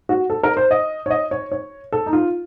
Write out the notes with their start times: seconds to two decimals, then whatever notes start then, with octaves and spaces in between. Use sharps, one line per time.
0.09 F#4
0.30 A4
0.43 A#4
0.57 C5
0.71 D#5
1.06 C#5
1.10 D#5
1.31 C#5
1.52 C#5
1.92 A4
2.06 D#4
2.13 F4